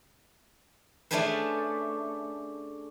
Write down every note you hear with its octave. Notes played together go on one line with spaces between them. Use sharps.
A3 C#4 D4 G#4 B4 C5